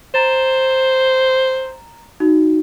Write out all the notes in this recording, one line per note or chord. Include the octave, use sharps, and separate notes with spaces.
C5 A#5 A6 E7
D#4 F#4